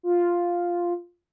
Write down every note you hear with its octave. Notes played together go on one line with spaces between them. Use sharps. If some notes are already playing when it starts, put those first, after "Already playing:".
F4